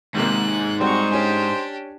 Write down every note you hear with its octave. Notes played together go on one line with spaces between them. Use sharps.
G#1 G#2 C3 A#3 F#6
G3 C4 D#4 F#4 C5 D#5 C#6
C#4 D4 G4 G#5